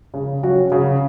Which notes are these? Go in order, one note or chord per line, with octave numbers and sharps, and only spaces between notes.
C#3
F#3 C#4 F#4
C#3